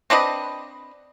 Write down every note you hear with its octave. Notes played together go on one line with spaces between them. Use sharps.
C4 D4 B4 D#5